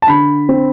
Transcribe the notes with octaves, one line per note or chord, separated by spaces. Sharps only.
A5
D3 B5
C4